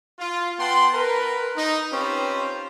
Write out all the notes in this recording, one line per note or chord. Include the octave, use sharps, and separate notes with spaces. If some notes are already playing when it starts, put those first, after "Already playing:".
F4
B3 F#5 G5 A5 C6
A#4 B4
D#4
C4 C#4 F4 G4 B4 C5